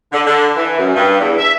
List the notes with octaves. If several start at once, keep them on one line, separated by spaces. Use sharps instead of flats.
D3
D3
E3
F#2
G2
E2
E5